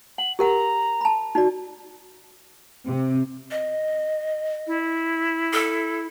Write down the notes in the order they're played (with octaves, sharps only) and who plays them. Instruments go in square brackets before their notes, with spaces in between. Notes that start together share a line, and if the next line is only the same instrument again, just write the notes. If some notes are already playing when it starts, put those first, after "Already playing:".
[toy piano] F#5 [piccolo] F#7
[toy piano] G4 A#4 F#5 [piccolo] A#5
[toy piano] A5 B5
D#4 F#4 D5
[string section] C3
[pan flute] D#5
[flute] E4
[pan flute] A4